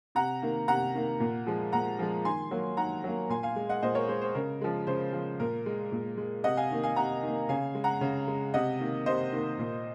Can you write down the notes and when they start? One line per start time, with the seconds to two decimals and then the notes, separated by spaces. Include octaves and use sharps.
0.15 C3 F#5 A#5
0.42 D#3 A#3
0.68 C3 F#5 A#5
0.95 D#3 A#3
1.20 A#2
1.47 F3 G#3
1.72 A#2 F#5 A#5
1.99 F3 G#3
2.25 D#3 G#5 C6
2.51 F#3 A#3
2.77 D#3 F#5 A#5
3.04 F#3 A#3
3.29 A#2 G#5 C6
3.43 F5 G#5
3.56 G#3
3.69 D#5 F#5
3.82 A#2 C5 D#5
3.95 A#4 C#5
4.08 G#3 C5
4.21 C5
4.35 C#3 A#4
4.61 F3 G#3
4.87 C#3 C5
5.13 F3 G#3
5.40 A#2 A#4
5.66 G#3
5.92 A#2
6.17 G#3
6.44 C3 D#5 F#5
6.57 F5 G#5
6.71 D#3 A#3
6.83 F5 G#5
6.96 C3 F#5 A#5
7.23 D#3 A#3
7.49 C#3 F5 G#5
7.75 G#3
7.84 F#5 A#5
8.01 C#3
8.28 G#3
8.54 C3 D#5 F#5
8.80 D#3 A#3
9.06 C3 C5 D#5
9.32 D#3 A#3
9.59 A#2